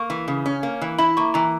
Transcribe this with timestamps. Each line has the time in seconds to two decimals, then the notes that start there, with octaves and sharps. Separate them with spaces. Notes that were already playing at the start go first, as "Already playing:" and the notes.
Already playing: A#3 C#6
0.10 E3
0.28 C#3
0.46 C#4
0.63 A#3
0.81 E3
0.99 E4 B5
1.17 A#3 C#6
1.34 E3 A#5